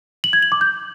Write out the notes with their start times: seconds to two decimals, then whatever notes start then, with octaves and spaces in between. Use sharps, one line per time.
0.24 F#7
0.33 G#6
0.42 F#7
0.52 D6
0.61 G6